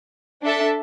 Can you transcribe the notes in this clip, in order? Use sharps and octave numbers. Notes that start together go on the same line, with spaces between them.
D4 A4 E5 A5